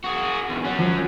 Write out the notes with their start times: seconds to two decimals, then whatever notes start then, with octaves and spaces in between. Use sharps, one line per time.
0.04 F#4 G#4
0.49 B1 E2
0.65 F#3 C#4
0.78 F3